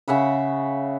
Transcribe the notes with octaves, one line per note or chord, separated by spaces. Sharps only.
C#3 E5 F#5 B5